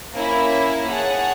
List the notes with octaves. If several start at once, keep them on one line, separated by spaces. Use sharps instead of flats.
A#3 C#4 E4
G#4 C#5 F#5 A5